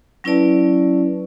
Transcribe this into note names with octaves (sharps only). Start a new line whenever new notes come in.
F#3 C#4 E4 B4 D5 A5